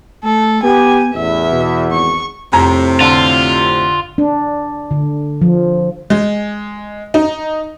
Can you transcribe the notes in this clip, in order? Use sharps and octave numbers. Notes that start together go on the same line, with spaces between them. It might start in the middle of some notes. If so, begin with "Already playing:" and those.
A3 A4
B3 G4 G#5
A1 E2 E5
B2
G#1 C#6
F2 A2 C3 A#5
D3 F4
D4
D3
F3
G#3
D#4